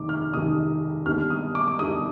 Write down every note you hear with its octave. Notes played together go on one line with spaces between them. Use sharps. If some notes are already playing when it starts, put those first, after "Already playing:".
Already playing: F1 D#3 D6
F6
F1 D#2 D#3 D#6
D#2 D3 G3 B3 F6
D#6
D6
D6
D#2 D3 G3 B3 D#6